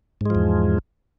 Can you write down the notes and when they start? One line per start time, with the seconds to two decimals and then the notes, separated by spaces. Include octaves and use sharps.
0.21 G#2
0.26 G#3
0.30 F3
0.35 E2